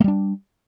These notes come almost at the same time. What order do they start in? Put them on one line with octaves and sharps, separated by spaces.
A3 G3 D4